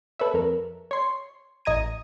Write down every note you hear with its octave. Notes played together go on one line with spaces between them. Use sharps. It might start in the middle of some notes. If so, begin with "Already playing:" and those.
A4 B4 C#5 E5
F2 A#4
C#5 C6
A1 D#5 A#5 G#6 D#7